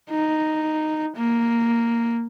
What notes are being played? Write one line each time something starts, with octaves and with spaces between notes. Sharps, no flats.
D#4
A#3